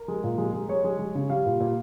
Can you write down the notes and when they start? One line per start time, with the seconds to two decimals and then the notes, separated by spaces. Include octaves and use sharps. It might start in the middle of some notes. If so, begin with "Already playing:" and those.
Already playing: A#4
0.08 G#3
0.24 A#2
0.38 G#3
0.53 G#3
0.69 G#3 C#5
0.84 G#3
0.99 G#3
1.15 C#3
1.30 G3 F5
1.46 A#2
1.60 A#2